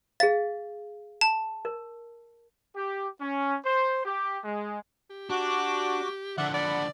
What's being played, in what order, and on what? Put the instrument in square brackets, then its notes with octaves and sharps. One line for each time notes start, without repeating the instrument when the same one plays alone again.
[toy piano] G#4 F5 [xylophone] A6
[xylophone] A5
[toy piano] A#4
[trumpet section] G4
C#4
C5
G4
G#3
[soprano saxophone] G4
[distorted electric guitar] D4 [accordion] F#4 D6
[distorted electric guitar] D3 F3 [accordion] D5 E5 [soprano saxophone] F#5
[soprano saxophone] D5 [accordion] F#5 B5